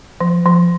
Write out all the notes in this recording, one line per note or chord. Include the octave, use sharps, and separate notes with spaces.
F3
F3